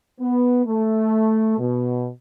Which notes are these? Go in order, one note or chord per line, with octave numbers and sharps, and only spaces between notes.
B3
A3
B2